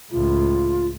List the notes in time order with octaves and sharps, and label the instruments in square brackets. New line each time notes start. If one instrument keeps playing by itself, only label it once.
[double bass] C#2 A2 [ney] F4